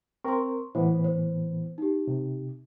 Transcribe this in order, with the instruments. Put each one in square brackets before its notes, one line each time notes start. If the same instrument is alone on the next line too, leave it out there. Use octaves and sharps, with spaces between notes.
[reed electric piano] C4 A#4 [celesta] C6 C#6
[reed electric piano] A2 E3 B3 [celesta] C5
[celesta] C5
D#4 G4
[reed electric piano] C3